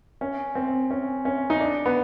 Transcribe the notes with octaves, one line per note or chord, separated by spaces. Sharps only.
C#4
C4
C#4
C#4
D#4
D4
B3